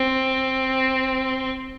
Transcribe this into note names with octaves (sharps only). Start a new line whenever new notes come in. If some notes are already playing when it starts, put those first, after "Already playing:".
Already playing: C4